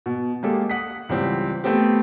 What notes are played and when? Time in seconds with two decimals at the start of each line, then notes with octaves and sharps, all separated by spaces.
0.06 B2
0.43 G#3 A#3 G4 A4
0.70 F#5 D#6 B6
1.09 C#2 E3 G3 C4
1.64 A3 B3 C4 G4